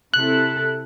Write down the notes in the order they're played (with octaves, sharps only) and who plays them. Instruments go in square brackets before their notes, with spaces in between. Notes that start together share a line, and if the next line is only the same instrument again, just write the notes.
[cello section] C3 E4 A4 [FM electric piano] F#6